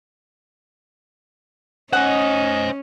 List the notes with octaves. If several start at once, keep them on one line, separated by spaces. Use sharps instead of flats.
C#4 C5 D#5 F#5 G#5